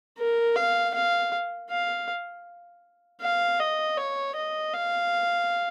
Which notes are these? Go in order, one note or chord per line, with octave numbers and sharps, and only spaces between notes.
A#4
F5
F5
F5
F5
D#5
C#5
D#5
F5